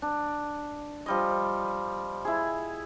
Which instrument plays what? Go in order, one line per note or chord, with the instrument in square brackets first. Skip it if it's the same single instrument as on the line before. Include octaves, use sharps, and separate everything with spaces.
[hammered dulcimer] D4
F3 G3 D#5
E4 G#4